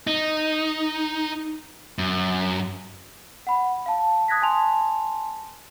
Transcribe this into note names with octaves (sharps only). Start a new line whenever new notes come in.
D#4
F#2
F#5 B5
F5 A5
D#6 F#6 G#6 A#6 B6
G#5 A5 C6 F7